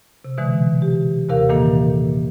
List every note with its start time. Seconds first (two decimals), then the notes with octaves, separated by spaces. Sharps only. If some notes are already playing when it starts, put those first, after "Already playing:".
0.25 C3
0.38 B2 D3 E3 G#3
0.82 G4
1.29 D#2 C3 G4 A#4 F5
1.49 A#2 D#3 E3 A#3 A4